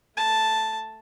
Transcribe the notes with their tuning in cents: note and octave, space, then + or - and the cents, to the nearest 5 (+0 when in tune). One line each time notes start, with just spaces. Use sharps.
A3 +0 A5 +0